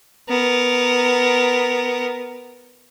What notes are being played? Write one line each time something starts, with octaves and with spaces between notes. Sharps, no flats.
B3 A#4